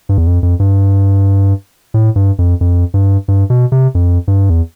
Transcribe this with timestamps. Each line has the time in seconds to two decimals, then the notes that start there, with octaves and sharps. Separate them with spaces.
0.09 G2
0.18 E2
0.27 F2
0.43 F2
0.60 G2
1.94 A2
2.16 G2
2.39 F2
2.61 F2
2.94 G2
3.28 G2
3.50 B2
3.72 C3
3.95 F2
4.28 G2
4.50 E2